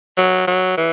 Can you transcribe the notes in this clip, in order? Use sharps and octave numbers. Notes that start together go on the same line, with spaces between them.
F#3
F#3
E3